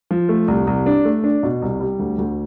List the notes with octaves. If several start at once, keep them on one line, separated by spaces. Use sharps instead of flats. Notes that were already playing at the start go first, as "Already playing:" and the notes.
F3
A3
C2
C2
D4
A3
D4
B2
C2
G3
D2
D2